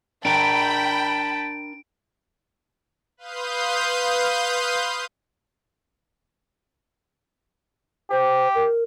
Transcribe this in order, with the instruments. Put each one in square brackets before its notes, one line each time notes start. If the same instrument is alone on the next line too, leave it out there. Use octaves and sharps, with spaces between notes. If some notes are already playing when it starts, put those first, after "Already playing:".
[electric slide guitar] D4 A#4 [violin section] G5 B5 [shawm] A5 [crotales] D7
[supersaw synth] B4 F5 C6 D#6 G6
[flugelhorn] G4 [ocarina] C5
[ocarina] A#4